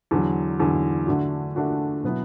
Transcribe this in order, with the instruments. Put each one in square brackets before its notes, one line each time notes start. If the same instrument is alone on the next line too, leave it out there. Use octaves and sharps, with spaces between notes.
[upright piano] E2 D3 F#3
E2 D3 F#3
D3 A3 D4 F#4
D3 A3 D4 F#4
B2 F#3 B3 E4